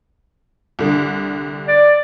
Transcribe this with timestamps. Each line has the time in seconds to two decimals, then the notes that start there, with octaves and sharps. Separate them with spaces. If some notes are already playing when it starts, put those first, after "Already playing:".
0.79 C2 D3
1.68 D5